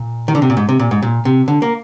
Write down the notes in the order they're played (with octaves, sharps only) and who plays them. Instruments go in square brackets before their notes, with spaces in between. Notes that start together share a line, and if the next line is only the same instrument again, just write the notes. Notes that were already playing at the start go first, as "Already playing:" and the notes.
Already playing: [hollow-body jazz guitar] A#2
D#3
D3
C3
A#2
G#2
C3
A#2
G#2
A#2
C3
D3
A#3